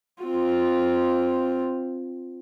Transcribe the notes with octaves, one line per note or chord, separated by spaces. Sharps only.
C4 F4